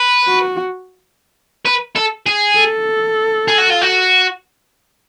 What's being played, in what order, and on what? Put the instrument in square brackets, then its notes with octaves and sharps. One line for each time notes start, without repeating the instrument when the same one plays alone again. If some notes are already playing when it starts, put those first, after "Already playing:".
Already playing: [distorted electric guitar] B4
[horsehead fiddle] F#4
[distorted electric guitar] B4
A4
G#4
[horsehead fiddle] A4
[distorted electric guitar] G#4
F#4
F4
F#4